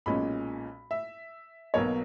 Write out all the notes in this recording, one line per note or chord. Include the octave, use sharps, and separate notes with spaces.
B1 A#2 G#3 C#4 B5
E5
B1 B2 F#3 A#3 C#5